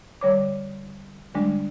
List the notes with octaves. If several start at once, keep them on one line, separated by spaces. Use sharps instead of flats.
D3 G3 C#5 D6
D3 G3 G#3 D4